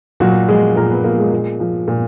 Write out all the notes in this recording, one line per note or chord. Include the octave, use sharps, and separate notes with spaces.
A#2 F#3 F#4
F3 G#3 G#4
A#2 A#3 A#4
B3 B4
F3 A#3 A#4
G#3 G#4
A#2
F3
A#2